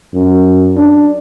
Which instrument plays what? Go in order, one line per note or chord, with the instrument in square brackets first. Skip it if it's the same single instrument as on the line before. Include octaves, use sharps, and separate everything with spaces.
[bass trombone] F#2
D4